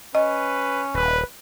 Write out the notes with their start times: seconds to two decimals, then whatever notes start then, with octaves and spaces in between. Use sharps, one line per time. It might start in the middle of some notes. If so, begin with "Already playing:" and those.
0.15 C#4 B4 D#5
0.95 D#1 B4